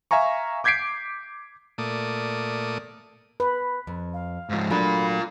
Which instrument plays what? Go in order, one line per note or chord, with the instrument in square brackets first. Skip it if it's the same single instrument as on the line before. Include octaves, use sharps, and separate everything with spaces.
[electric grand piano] E5 F5 G#5 A#5 C#6
D6 G6 G#6 B6 C7 D7
[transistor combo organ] A#2 A3 D5 D#6
[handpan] B4
[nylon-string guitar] F2
[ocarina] F5
[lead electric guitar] G#2 F3
[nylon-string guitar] F#3 A3 D4 [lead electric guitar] F4 A#4 [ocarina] B5